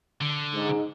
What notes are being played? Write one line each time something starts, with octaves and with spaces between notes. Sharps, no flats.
D3
G#2